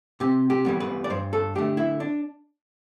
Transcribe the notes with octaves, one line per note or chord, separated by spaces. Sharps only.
C3 G4
G4
E3 G3 B3
B4
D5
G2 C5
A4
D3 A3 G4
E4
D4